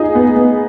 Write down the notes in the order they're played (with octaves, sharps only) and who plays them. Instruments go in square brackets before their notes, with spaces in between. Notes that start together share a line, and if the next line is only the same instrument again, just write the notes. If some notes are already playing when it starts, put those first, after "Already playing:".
Already playing: [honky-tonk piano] D#4 G#4 [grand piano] F4
[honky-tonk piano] B3
B3